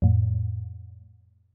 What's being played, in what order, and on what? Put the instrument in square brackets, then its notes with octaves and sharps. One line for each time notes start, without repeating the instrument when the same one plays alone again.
[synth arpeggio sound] F2 A2